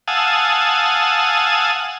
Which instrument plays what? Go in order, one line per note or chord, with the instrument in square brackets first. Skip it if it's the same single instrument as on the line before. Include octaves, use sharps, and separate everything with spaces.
[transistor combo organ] F5 F#5 G#5 A5 D#6 E6